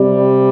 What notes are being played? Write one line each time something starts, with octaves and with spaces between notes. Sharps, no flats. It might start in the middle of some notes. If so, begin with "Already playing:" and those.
Already playing: C3 G3